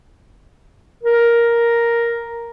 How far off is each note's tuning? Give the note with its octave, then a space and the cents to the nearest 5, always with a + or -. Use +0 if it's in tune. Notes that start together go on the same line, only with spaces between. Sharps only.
A#4 +5